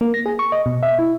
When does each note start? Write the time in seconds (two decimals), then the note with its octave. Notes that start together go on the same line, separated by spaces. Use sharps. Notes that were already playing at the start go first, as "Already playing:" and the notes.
0.01 A#3
0.14 A#6
0.26 G#4
0.39 C#6
0.52 D#5
0.66 B2
0.83 E5
0.99 E4